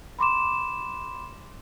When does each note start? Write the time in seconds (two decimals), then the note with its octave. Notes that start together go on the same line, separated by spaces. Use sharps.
0.19 B5 C6 D6 E7